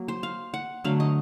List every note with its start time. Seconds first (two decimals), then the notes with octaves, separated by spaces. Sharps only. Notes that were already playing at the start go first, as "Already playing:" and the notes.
Already playing: F#3 A#3
0.08 C5
0.23 F5
0.54 F#5
0.84 D3 F#3 A3 F5
1.00 D#5